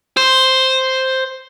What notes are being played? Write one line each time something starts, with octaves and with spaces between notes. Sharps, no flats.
C5